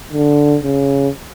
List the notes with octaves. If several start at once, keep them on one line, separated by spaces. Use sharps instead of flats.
D3
C#3